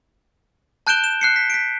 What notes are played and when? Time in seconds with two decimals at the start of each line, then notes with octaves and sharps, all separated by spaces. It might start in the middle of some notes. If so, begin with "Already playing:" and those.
0.87 A5 F#6 G6 D7 E7 G7
1.04 E7
1.21 F#6 C7 C#7
1.36 B6
1.50 B6 D7